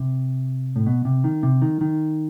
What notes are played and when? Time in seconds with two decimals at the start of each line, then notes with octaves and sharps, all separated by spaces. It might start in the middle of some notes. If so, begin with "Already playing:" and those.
Already playing: C3
0.76 A2
0.86 B2
1.05 C3
1.24 D#3
1.43 C3
1.62 D#3
1.81 D#3